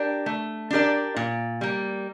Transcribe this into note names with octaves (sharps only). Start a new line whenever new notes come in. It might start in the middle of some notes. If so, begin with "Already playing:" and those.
Already playing: D4 G4 A#4 D5
A3
D4 G4 A#4 D5
A#2
G3 A#3